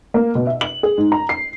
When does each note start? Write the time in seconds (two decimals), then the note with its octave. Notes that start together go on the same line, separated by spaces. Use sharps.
0.14 A#3
0.35 B2
0.47 E5
0.61 F#7
0.83 G#4
0.98 G#2
1.12 A#5
1.29 C7